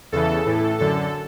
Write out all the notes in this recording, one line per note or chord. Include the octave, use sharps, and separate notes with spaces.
E2 C#3 E3 A4
A2 E3
F#2 D3 A4